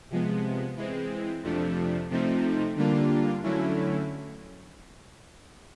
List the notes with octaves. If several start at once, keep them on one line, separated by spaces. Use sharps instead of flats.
C3 F3 G#3 B3
E3 G#3 C4
F2 C3 F3 A3 D4
C3 F3 A3 C4 D#4
D3 G3 A#3 D4 F4
D3 F#3 A3 C#4 E4